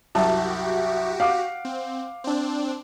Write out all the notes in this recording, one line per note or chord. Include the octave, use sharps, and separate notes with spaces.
C2 F#2 F#4 G4 A5
F5 F#5 D6
C4
C4 D4